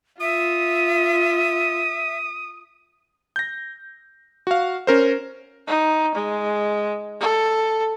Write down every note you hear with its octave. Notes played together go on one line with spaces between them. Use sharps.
F4 E5 D#6
G6 A#6
F#4 F5
C#4 A#4 C5
D#4
G#3
A4